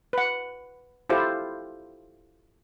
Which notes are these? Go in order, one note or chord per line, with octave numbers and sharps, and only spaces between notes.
B4 F#5
E4 F4 G4 A4 C5